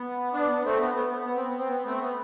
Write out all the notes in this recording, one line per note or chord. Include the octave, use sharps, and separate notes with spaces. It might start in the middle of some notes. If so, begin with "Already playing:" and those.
Already playing: B3
B3 D4
B3
A3 C4
B3
B3
B3
B3
C4
B3
C4
B3
A3 C4
B3